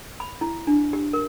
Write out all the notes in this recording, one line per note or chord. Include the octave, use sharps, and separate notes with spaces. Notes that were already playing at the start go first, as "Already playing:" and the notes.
B5
E4
D4
G4
A#4